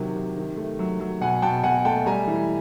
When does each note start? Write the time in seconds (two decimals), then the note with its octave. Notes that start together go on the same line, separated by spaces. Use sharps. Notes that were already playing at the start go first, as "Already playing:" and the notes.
Already playing: C3 D#3 F#3
0.16 C3
0.37 D#3
0.57 A3
0.79 F#3
1.00 F#3
1.21 B2 F#5 G#5
1.42 B2 G5 A5
1.63 B2 F#5 G#5
1.85 A3 G5 A5
2.06 G3 G#5 A#5
2.28 E3